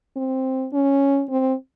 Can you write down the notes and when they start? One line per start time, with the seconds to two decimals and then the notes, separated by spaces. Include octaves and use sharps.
0.16 C4
0.73 C#4
1.30 C4